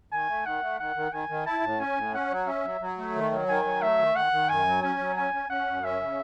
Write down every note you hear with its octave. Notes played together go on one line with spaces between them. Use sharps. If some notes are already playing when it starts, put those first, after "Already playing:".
D#3 G#5
A3
D#3 F#5
A3
D#3 F#5
D#3
D#3 G#5
D#3
E4 A5
A2
C#4 G#5
A2
C#4 F#5
F#3
C#4 E5
F#3
F#3
A3
D#3
F#3
D#3 G#5
F#3
A3 E5
D#3
D#3 F#5
D#3
F#2 G#5
F#3
C#4 G#5
F#3
C#4 G#5
C#4
C#4 F#5
F#2
C#4 E5
C#3